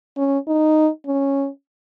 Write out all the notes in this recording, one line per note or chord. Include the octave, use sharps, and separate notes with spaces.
C#4
D#4
C#4